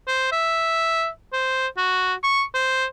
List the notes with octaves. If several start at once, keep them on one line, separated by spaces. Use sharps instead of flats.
C5
E5
C5
F#4
C#6
C5